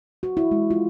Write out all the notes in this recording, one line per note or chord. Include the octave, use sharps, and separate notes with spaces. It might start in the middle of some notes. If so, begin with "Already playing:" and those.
F#4
E4
G#3
F4